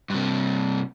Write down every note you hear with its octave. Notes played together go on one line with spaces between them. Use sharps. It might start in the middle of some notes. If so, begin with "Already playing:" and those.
G2 C3